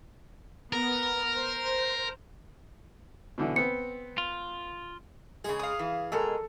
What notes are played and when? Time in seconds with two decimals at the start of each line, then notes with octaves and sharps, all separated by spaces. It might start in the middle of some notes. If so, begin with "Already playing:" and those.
0.73 B3 A#4
1.36 C5
3.38 B2 D3 E3
3.56 B3 C4 C#7
4.18 F4
5.44 C#3 G#3 G#4
5.60 F5 D#6
5.79 E3
6.12 B2 G#3 A4 A#4